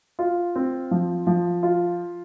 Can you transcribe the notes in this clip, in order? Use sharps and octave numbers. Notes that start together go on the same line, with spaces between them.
F4
C4
F3
F3
F4